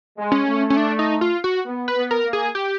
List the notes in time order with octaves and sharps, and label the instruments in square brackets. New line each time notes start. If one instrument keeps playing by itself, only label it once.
[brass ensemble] G#3
[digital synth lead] C#4
[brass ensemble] A3
[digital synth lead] C#4
D4
D#4
F4
F#4
[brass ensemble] B3
[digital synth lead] B4
[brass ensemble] B3
[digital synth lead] A#4
[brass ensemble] A#3
[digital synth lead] G#4
G4